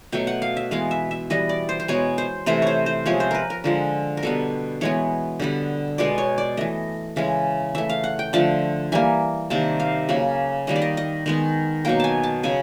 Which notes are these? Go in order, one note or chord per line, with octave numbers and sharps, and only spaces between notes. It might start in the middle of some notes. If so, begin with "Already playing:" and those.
B2 F#3 A3 G5
F#5
F5
E5
E3 G#3 B3 F5
E5
E5
E3 G3 B3 D#5
D5
C5
C5
B2 G#3 B3 C#5
C5
C3 E3 A3 C5
C5 C#5
C5
C3 F3 G#3 B3 C#5
C5
A#4 B4
A#4
D3 F3 G#3
A#4
B2 G3 B3 A4
E3 G#3 B3 C#5
D3 G3 B3
B2 G#3 B3 D5
C#5
D5
E3 A3 D#5
C#3 E3 G#3
E3 A3 E5
F5
F#5
G5
D3 F3 A3 A5
E3 G3 A#3 G#5
C3 D#3 G3 A#3 A5
F5
C#3 F#3 A#3
D#3 G3 A#3 D#5
D5
D#5
D#5
D#3 G#3 B3
B2 F#3 A#3 G5
G#5 A5
A5
C#3 F#3 G#5